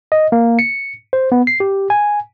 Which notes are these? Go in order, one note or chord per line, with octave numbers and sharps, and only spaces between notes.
D#5
A#3
C#7
C5
B3
C7
G4
G#5